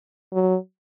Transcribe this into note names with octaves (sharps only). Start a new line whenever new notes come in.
F#3